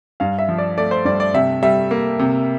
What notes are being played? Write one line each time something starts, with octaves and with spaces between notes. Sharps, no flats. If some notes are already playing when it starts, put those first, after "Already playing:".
G2 F5
E5
F3
D5
A3 D5
C5
G2 D5
D5
C3 E5
G3 E5
A#3
C3